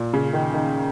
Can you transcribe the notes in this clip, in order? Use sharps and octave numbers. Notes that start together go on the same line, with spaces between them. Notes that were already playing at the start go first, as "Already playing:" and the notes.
Already playing: A#2
C#3
D#3
D#3